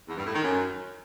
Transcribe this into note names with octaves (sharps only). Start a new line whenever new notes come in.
E2
G2
A2
D#3
F#2